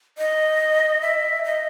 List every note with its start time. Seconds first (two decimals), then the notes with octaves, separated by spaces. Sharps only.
0.18 D#5
1.01 E5
1.44 D#5